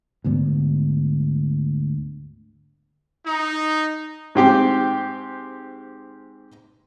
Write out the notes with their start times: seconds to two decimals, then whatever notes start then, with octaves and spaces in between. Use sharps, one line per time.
0.24 D2 G#2 D3 B3
3.26 D#4
4.35 G#2 C4 G4